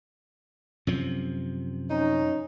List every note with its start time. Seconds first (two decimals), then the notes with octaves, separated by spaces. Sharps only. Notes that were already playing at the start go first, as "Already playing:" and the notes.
0.87 F#2 C3 F3
1.89 C#4 D#4